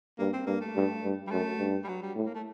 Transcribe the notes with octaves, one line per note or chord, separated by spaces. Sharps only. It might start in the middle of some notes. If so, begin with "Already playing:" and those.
G2 A#3
C4
G2 A#3
A3
G2
G2
G3
F#2 A3
G2
G3
F#3
G3
A2
A#3
A3